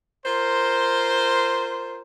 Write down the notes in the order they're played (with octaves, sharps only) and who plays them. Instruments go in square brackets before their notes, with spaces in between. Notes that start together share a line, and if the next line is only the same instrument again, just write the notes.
[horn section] F4 A#4 C5